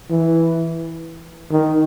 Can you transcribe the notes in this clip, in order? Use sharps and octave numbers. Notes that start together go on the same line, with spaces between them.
E3
D#3